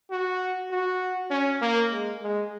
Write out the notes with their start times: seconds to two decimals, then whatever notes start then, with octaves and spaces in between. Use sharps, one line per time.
0.11 F#4
0.71 F#4
1.30 C#4
1.61 A#3
1.92 G#3
2.21 G#3